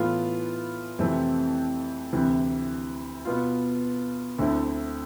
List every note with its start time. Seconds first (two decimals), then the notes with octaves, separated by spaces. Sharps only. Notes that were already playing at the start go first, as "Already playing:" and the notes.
Already playing: A2 E3 B3 F4 A4
0.99 F2 C3 E3 A3 C4
2.13 D2 C3 E3
3.25 B2 B3 F4
4.39 D2 D3 A3 C4 E4